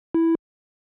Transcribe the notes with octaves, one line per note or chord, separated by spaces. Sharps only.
E4